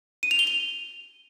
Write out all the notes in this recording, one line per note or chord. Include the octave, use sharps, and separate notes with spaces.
D#7
F7
G7
F7